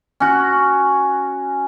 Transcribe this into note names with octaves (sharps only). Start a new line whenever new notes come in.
C#4 F#4